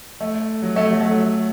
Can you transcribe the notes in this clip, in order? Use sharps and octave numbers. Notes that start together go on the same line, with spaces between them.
A3
F#3
A3
F#3
A3
F#3